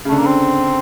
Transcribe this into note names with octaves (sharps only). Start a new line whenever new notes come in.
C#3
A3
D3
A#3
D3 C4